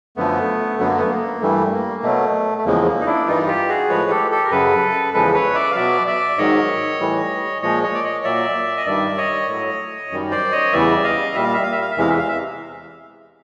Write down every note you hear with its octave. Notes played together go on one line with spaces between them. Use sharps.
F#2 D3 F3 A3 B3
F#2 D3 F#3 B3
A#3
A3 B3
A#3
G2 E3 G3 A3
A#3
B2 F#3 A3
A3
E2 C#3 F3 G#3 A#3
A#3
D#4
D4 E4
G2 E3 G3 D#4 F4
F4 G4
F#4 G#4
A2 F3 G#3 B4 C#5
G4 A4
G4 A4
A#4
F#2 C#3 F#3 A4 B4
E2 C#3 F3 G#3 A4 B4
B4 C#5
D5 E5
F5
B2 F#3 D5 E5
D5 E5
G#2 D#3 F#3 C#5 D#5
A2 E3 G3
A#2 F3 G#3 C#5 D#5
C#5 D#5
D5
C#5 D#5
A#2 F#3 D5 E5
D#5
G2 D#3 G3 D5 E5
C#5 D#5
A2 F#3
F#2 D#3 G3
C5 D5
C#5 D#5
E2 C#3 E3 G3 D5 E5
D#5 F5
A#2 G3 E5
F5
E5
F5
E5
F5
E5
E2 C3 E3 G#3 F5
E5
F5
E5